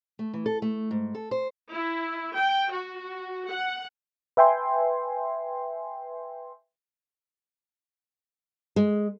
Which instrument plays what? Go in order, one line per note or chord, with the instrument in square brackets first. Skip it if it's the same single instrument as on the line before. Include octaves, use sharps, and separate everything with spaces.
[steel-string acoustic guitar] A3
E3
A4
A3
G#2
A4
C5
[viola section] E4
G5
F#4
F#5
[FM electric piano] B4 E5 G5 G#5 C6
[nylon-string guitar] G#3